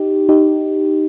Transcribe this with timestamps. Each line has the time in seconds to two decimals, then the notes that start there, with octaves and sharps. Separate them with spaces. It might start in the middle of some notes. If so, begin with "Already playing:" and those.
Already playing: D#4 G4
0.29 D#4 G4